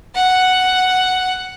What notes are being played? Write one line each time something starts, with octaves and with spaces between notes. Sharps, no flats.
F#5